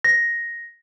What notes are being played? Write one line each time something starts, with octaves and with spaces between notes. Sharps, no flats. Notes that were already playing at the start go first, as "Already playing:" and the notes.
A#6